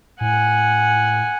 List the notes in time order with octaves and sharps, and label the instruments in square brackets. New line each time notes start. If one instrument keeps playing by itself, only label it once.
[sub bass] A2 [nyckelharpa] F#5 G#5